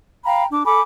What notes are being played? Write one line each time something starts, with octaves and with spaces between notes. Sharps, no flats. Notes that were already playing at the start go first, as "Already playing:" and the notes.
F5 G5 A#5 B5
D4 D6
A4 G#5 B5 D6